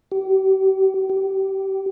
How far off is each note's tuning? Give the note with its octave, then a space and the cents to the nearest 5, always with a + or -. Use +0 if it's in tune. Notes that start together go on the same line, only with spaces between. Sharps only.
G4 -40
G4 -25